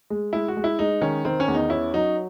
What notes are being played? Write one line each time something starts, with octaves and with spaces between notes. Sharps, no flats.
G#3
G#3 E4
F#4
G#3
E4
G#3 D#4
D#3 C#4
D#3 C4
C#4
E2
D#4
C#4 E4
F#3 D#4